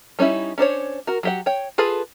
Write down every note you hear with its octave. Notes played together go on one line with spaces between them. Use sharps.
G3 C#4 D#4 E4
C#4 D4 C5 C#5
F#4 A#4
F#3 G4 F#5
C#5 G5
F4 G#4 A4 B4